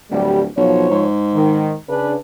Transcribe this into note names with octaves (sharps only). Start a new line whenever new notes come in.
D1 G3
B1 F3 C#5
G#2
D#3
C#3 D4 B4